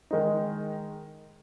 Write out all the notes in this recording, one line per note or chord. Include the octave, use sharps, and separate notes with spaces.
D#3 G#3 D#4